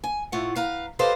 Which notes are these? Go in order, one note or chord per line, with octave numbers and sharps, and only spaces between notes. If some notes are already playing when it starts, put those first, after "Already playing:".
G#5
A2 A3 F4 F#5
B4 F5 A#5
G4 A4 B4 C5 D#5 F5